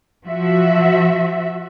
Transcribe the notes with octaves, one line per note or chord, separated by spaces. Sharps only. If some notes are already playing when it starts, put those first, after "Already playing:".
F3 F#4 E5